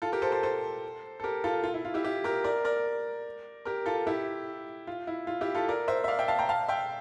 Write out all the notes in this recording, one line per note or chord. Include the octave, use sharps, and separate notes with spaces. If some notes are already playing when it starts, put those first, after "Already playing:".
F4 A4
G4 A#4
A4 C5
A4 C5
A4 C5
A4
G4 A#4
F4 A4
F4
E4
F4
E4 G4
E4 G4
G4 A#4
A#4 D5
A#4 D5
G4 A#4
F4 A4
E4 G4
F4
E4
F4
E4 G4
F4 A4
A#4 D5
C5 E5
E5
D5 F5
E5 G5
F5 A5
G5 A#5
F5 A5
E5 G5